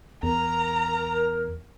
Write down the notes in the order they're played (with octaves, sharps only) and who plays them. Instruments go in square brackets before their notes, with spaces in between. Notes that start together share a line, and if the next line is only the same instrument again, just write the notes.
[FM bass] E2 [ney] A#4 [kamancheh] A#5